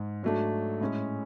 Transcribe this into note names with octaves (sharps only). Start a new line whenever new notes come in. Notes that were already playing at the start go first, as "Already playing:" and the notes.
Already playing: G#2
G#2 F#3 A3 D4
A2 G#3 C#4